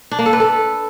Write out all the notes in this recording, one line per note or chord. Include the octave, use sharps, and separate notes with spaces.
D4
A#3
A4
B4
A4